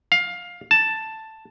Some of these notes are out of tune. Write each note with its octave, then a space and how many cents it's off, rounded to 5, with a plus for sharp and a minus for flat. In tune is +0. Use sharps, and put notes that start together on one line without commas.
F5 +15
A5 +5